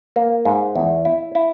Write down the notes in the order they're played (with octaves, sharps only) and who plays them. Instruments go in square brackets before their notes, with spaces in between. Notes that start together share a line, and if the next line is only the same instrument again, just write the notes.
[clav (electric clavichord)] A#3
G#2
E2
E4
E4